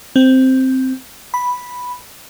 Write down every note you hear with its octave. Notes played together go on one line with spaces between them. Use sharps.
C4
B5